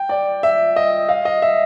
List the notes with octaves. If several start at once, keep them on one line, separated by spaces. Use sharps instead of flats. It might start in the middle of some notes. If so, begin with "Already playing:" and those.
Already playing: G5
D5
E5
D#5
F5
D#5
E5